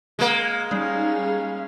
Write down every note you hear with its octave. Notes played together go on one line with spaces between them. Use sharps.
G#3 A#3
G3 C#4 D#4 G#4 F5